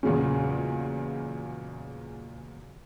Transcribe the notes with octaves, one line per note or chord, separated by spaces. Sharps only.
E2 A#2 C#3 F#3 G#3 C#4